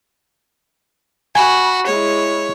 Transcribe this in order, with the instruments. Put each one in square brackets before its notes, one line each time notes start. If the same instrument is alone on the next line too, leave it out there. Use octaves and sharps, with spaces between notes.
[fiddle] F#4 [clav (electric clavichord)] G#5 [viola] B5
[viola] G#3 E4 [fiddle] C#5